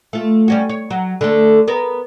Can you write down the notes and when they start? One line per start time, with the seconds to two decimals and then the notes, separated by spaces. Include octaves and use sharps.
0.13 A3 F4
0.48 G3 C#4 F#4
0.69 C#5
0.90 F#3
1.21 D3 A3
1.68 B3 A#4